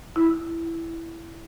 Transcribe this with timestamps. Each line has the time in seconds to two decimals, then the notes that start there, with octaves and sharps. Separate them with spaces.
0.16 E4